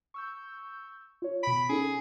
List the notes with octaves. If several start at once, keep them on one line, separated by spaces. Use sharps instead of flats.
C#6 E6 G6
F4 C#5
B2 B5 D7
C#4 D#4 G#4 A4